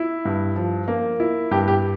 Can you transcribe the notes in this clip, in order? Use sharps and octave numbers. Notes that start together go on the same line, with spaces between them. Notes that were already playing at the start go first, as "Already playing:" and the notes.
Already playing: E4
G2
F3
A#3
E4
G2 G4
G4